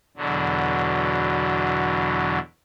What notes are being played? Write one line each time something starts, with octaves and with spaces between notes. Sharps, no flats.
E2 B2 D3 F#3